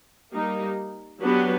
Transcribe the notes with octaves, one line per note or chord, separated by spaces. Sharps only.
G3 A#3 D#4 G4
F#3 B3 D4 G4 B4